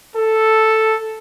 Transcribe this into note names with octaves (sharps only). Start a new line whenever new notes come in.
A4